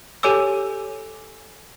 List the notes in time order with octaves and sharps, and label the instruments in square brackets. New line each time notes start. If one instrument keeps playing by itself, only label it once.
[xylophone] G4 A4 C#5 G#5 D6 E6